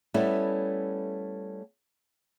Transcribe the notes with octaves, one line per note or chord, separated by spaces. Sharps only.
G3 A3 B3 C#4 E4 A4